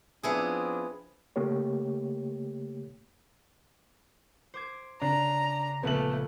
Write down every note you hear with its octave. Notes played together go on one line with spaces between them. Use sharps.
F3 B3 C4 D4 E4 G#4
C#3 A3 A#3 G4 C#5
C5 D6 G#6
C#3 D4 A#5
A#1 C#3 A3 B3 B4 F#7